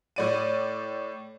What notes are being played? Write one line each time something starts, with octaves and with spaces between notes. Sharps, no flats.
A2 D5 D#7